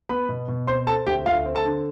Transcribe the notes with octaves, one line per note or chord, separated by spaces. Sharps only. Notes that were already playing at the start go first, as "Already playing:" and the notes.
B3 B4 B5
B2
B2
C4 C5 C6
C4 A4 A5
D2 G4 G5
D2 F4 F5
C4
A4 A5
D3